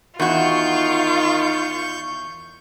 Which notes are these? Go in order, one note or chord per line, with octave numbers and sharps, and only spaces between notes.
E2 D#3 F4 F#4 C#6 G6